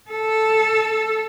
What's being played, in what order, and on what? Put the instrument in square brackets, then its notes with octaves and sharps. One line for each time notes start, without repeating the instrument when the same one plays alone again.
[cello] A4